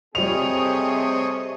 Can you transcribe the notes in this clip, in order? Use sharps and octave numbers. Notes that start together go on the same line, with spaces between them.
C3 G3 A3 C4 G#4 C#5 D#5 F7